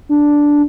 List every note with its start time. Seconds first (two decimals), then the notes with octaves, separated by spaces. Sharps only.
0.09 D4